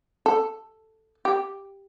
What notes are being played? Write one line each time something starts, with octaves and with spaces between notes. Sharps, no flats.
A4
G4